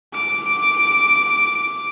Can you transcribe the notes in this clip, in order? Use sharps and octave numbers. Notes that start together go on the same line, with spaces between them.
D6 D7